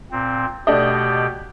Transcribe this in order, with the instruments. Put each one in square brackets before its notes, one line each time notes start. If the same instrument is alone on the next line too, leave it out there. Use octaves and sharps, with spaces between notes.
[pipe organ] A#2 C4
[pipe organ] B2 G4 [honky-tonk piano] A3 D4 D#5